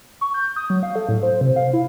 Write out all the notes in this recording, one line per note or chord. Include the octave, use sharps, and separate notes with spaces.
C#6
G6
D#6
F#3
F5
A4
A2
C5
C3
F5
E4